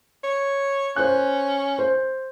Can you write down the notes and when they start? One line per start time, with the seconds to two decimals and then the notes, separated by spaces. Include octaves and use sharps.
0.23 C#5
0.96 C#4 C5 F#6
1.79 C5